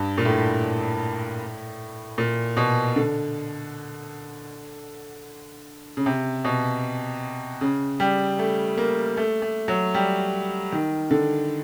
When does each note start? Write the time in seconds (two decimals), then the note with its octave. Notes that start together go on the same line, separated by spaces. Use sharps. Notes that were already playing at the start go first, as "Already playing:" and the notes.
Already playing: G2
0.18 A#2
0.25 A2
2.18 A#2
2.57 B2
2.96 D3
5.97 C#3
6.06 C3
6.45 B2
7.61 C#3
8.00 G3
8.39 A3
8.77 A#3
9.17 A3
9.42 A3
9.68 F#3
9.94 G3
10.72 D#3
11.11 D3